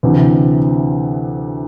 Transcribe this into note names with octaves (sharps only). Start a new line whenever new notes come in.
D2 C3 E3